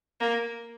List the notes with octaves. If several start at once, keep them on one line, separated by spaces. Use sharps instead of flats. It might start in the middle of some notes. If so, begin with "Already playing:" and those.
A#3